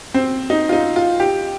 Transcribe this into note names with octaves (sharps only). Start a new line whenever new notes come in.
C4
D#4
F4
D#4
F4
G4